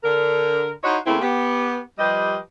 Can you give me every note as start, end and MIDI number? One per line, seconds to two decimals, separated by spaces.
0.04 0.71 50
0.04 0.71 70
0.84 0.97 63
0.84 0.97 64
0.84 0.97 66
0.84 0.97 72
0.84 0.97 73
0.84 0.97 75
1.05 1.21 49
1.05 1.21 57
1.05 1.21 58
1.05 1.21 60
1.05 1.21 64
1.21 1.81 59
1.21 1.81 67
1.99 2.38 53
1.99 2.38 55
1.99 2.38 67
1.99 2.38 71
1.99 2.38 75